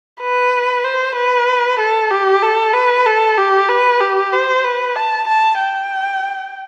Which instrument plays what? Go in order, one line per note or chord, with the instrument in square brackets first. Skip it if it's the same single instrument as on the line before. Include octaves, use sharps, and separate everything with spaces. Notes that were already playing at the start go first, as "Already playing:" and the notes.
[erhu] B4
C5
B4
A4
G4
A4
B4
A4
G4
B4
G4
C5
B4
A5
A5
G5